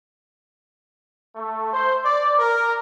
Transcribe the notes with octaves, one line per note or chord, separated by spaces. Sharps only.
A3
C5
D5
A#4